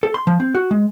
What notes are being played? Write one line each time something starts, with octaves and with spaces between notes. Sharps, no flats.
A4
C6
F3
C4
F#4
G#3